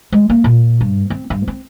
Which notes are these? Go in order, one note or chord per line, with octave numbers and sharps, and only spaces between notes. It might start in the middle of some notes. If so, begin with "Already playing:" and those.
G#3
A#3
A#2
G2
C4
G2
C4